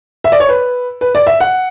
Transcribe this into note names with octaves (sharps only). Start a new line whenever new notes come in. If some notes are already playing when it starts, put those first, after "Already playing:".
E5
D5
C#5
B4
B4
D5
E5
F#5